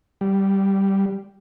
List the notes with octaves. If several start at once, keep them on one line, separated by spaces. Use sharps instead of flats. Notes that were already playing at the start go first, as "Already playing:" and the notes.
G3